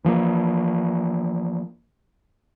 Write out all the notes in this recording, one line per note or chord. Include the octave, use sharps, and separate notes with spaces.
E3 F3 G#3 A#3